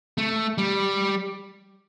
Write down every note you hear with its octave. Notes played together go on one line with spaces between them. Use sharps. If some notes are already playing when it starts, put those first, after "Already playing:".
A3
G3